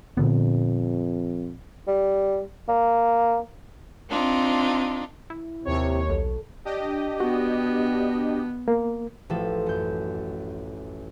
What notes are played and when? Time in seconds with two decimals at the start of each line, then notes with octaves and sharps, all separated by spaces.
0.17 F2 A#2 D3 B3
1.88 G3
2.69 A#3
4.10 C4 D4 D#4 F4
5.30 E4
5.65 D#2 C3 C#5
6.09 B1 A4
6.65 D4 G4 D#5
7.20 B3 F#4
8.68 A#3
9.29 A1 F3 A4
9.66 F#2 G6